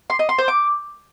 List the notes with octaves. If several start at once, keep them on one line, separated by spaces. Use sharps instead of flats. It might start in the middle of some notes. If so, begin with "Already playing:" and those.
C6
D#5
C6
C5
D6